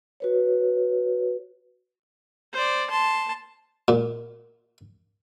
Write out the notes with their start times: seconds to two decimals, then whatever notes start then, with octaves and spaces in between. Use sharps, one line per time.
0.20 F#4 B4 C#5
2.53 C5 D5
2.90 A5 C6
3.88 A#2